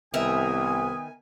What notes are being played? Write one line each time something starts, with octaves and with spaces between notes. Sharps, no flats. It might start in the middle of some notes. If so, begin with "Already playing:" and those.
C2 D#3 B3 A#4 E5 G#5 D#6